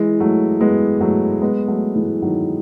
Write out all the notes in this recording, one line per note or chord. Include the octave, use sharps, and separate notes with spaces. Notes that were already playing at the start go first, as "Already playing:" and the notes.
Already playing: E3 G#3
F#3 A3
G#3 B3
F#3 A3
G#3 B3
F#3 A3
E3 G#3
D#3 F#3